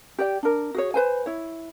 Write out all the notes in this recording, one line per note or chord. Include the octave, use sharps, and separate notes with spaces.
G4 D5 G5
D4 A#4
F#4 G#4 C#5
B4 C5 G#5
E4 C#5